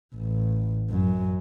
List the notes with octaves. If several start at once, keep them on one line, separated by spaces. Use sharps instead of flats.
A1
F#2